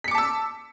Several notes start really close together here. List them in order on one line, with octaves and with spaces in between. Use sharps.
B6 C#7 D6 A5 E6